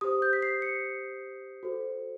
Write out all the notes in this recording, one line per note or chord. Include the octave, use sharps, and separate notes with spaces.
G4 C5 D#6
G6
B6
C7
C#7
F#4 A4 C5